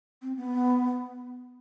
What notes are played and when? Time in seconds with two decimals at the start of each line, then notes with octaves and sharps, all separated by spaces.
0.22 C4
0.36 B3